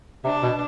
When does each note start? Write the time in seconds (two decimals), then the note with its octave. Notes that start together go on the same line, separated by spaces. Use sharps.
0.24 C3 D4
0.42 B2